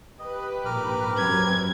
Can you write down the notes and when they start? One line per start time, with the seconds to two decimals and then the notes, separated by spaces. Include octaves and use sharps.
0.19 G4 B4 D#5
0.65 A#1 G#2 A#4 D6 F6
1.17 F#2 C4 C#4 G#6